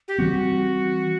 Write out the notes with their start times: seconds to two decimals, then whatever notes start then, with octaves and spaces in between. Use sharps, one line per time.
0.08 G4
0.19 E3 G3 C4 F#4